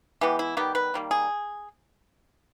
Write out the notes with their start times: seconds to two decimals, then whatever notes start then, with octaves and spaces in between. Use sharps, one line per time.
0.21 E3 G#3 B3 G4
0.39 E4
0.57 D#3 G3 B3 G4
0.75 B4
0.94 D#3 G3 A#3
1.11 G#4